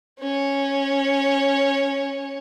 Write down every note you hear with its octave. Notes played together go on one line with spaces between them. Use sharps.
C#4 C#5